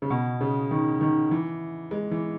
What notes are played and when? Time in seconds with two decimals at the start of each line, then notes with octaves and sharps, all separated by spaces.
0.02 C#3
0.10 B2
0.41 C#3
0.71 D#3
1.01 D#3
1.31 E3
1.91 G#3
2.11 E3